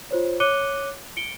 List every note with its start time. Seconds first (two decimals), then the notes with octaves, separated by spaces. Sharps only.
0.11 F4 C5 C#5
0.40 C#5 D6 F#6 C#7 D#7 G7
1.17 C#7 D7 G7